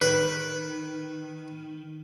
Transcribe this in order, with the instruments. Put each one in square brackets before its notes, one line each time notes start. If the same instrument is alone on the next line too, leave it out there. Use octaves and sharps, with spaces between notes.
[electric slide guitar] D#3 [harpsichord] B4